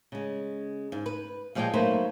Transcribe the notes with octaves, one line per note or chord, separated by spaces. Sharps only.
C#3 G#3
G#2
B4
A#2 F3 G#3 D5 F5 G5
D#3 F#3 A3 A#3 B4 C5